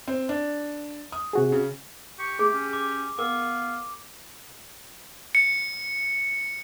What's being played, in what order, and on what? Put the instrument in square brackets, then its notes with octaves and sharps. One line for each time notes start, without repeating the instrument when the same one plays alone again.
[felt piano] C4
D4
D#6
[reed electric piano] C3 F#4 G#4
[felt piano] C#3
[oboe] G4 [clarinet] C#6
[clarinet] A3 [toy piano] G#4
[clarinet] C#4
[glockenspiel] D6
[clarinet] B3 [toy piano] A#4 [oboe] F5 [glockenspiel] D6
[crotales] C#7